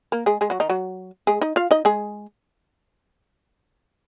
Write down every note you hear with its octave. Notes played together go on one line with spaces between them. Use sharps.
A#3 A#4
G#3 G#4
G#3 G#4
F#3 F#4
D#3 D#4
F#3 F#4
G#3 G#4
D#4 D#5
F4 F5
D#4 D#5
G#3 G#4